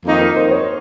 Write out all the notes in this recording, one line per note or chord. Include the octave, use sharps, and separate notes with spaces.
F2 D#3 A#3 D#4
A#4
C5
C#5